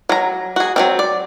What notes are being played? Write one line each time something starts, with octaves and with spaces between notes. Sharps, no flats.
F#3 A#5
F#4 G#4
F#3 A3 C4
D5